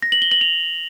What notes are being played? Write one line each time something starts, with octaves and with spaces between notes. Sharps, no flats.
A#6
F#7
G7
F#7
F7